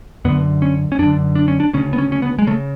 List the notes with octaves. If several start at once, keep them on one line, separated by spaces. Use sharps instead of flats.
F#2 D3 B3
C#4
C#4
F#2 D3 D4
D4
C#4
D4
D2 C#3 C#4
B3
C#4
C#4
B3
G#3
C#3 A3